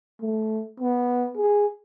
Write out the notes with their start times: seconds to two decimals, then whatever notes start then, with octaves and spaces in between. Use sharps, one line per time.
0.21 A3
0.80 B3
1.38 G#4